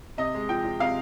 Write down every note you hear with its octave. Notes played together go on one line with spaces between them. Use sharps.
C3 D#5
G#3
F3 G5
F3
C3 F5